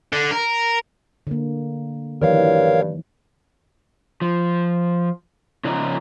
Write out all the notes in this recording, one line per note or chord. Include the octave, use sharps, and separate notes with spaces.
D3
A#4
D3 A#3
G2 D#3 E3 F#3 A#4 C#5 F5
F3
C#3 F3 D#4 F4 D5 A#5